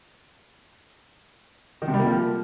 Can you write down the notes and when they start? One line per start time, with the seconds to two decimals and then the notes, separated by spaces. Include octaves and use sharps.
1.82 D#3
1.88 C3
1.94 G3
2.00 A#3
2.06 F3